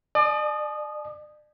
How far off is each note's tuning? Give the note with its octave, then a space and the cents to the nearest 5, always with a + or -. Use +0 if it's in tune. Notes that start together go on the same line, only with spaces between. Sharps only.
D5 +35 A5 -45 D#6 -15